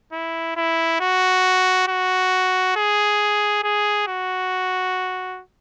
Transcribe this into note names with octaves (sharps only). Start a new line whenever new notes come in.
E4
E4
F#4
F#4
G#4
G#4
F#4